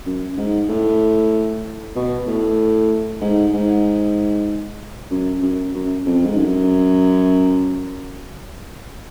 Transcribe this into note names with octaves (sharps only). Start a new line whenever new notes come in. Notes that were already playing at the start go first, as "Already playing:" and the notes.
F#2
G#2
A2
B2
A2
G#2
G#2
F#2
F#2
F#2
F2
G#2
F#2